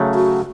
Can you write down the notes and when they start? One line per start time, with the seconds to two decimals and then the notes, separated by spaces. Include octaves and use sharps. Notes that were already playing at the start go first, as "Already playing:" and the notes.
Already playing: C#3 F#3 A3
0.15 F#4